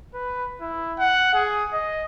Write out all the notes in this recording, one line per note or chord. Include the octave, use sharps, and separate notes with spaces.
B4
E4
F#5
G#4
D#5